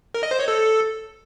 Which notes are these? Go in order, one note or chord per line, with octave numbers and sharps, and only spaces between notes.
A#4
D#5
C5
C#5
A4